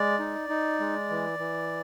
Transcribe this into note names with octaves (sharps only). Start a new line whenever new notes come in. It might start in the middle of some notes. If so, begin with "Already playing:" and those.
Already playing: G#3 D5
D#4
D#4
G#3
E3
E3